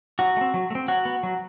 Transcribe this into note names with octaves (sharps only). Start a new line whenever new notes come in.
F#3 F#4
A3
C4
F#3
A3
C4
F#3 F#4
B3
F#3